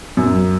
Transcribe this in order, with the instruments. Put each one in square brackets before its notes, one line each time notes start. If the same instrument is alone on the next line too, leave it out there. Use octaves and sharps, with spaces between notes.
[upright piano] F#2